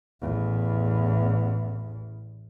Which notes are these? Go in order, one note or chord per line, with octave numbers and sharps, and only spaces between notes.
A1 E2